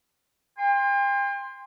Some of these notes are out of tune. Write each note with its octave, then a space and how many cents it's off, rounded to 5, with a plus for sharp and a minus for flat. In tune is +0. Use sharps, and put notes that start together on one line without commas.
G5 +40 C6 +0